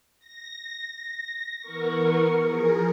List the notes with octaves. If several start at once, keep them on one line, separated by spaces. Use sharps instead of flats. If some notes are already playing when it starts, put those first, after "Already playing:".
A#6
A#6
E3 B3 A#4 C#6
F3 G#4 A#4